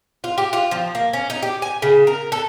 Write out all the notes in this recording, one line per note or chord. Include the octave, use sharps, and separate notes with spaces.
F4
G4
F4
F3
A#3
C#4
D#4
G4
G#5
C#3
A#4
A4